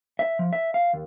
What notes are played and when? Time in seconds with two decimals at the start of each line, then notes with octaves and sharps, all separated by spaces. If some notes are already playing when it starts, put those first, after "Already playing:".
0.19 E5
0.39 F3
0.53 E5
0.74 F5
0.93 D#2